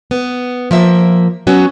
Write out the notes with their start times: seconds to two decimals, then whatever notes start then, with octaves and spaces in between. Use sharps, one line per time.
0.11 B3
0.71 F3 A#3 E5
1.47 F#3 B3 C#4 F#4